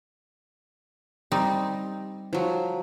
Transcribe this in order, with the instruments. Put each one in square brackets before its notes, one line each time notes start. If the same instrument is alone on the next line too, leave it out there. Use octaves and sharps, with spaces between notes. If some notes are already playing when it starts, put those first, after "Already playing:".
[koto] G3 C4 D#4
[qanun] F3 F#3